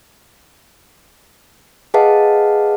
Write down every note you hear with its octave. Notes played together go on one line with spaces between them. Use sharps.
G#4 B4 D#5 F5 F#5 A5